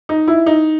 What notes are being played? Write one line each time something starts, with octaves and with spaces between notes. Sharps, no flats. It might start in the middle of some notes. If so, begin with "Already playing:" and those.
D#4
E4
D#4